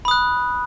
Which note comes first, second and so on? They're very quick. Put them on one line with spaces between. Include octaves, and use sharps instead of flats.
B5 D#6 F#6